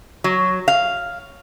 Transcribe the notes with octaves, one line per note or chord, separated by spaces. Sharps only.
F#3
F5